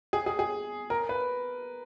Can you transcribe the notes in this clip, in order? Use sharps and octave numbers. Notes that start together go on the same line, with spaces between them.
G#4
G#4
G#4
A#4
B4